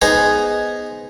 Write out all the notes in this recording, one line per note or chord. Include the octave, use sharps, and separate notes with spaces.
B3 D#4 G#4 C5 G#5 A#5